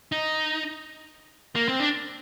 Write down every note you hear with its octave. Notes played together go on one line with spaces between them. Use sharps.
D#4
A#3
C4
D4